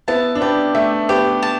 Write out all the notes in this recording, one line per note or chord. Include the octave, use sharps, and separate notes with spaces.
B3 E4 A5
D4
B3 G4
A3 E5
B3 G4
A5